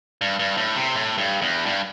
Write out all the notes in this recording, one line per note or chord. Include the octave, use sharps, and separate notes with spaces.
G2
G2
A2
C3
A2
G2
E2
G2